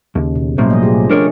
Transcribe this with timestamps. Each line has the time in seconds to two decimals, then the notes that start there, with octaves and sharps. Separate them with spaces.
0.15 D#2 C#3
0.35 B2
0.58 B1 A2 G3 A#3 C#4 C5
0.70 F3 D#5
0.83 G4 G#4
1.10 A3 D4 A#4 C#5 D#5